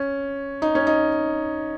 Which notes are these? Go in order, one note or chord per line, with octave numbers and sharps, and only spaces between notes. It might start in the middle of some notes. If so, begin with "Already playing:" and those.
Already playing: C#4
D#4
C#4
D#4